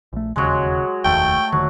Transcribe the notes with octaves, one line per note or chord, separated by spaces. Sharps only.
A#1 A3
E1 D#2 C#3 F#3 G#3
F1 D#2 A3 G5
E1 D3 D#3 F#3